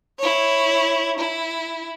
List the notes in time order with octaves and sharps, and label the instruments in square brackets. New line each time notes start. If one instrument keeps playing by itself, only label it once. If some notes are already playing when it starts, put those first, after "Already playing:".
[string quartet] E4 C#5
E4